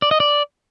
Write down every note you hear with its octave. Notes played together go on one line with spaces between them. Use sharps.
D5
D#5
D5